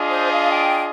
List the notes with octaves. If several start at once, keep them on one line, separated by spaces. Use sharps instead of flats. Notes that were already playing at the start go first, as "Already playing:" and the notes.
Already playing: D4 F4 G#4 D#5
C5
F5
G5